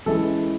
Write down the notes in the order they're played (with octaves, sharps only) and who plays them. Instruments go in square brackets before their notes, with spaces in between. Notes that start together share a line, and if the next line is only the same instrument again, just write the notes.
[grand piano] E3 G#3 C#4 E4 A4